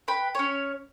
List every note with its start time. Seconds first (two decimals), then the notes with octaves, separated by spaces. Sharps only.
0.08 B4 G5 B5
0.35 C#4 C#5